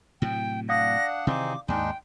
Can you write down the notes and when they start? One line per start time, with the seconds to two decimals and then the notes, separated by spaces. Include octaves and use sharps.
0.22 A2 C3 F#3 G5
0.69 D4 D5 F5 F#5 D#6 A#6
1.27 C3 D#3 E3 C4 D#4 G#4 D6
1.68 D#2 G#2 G#3 D4 D#4 G5